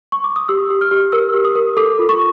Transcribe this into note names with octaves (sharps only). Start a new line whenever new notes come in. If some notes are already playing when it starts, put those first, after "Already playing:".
C#6
D6
D#6
G4 E6
G4
F6
G4
A#4 E6
G4
D#6
A#4
A4 D6
F4
C#6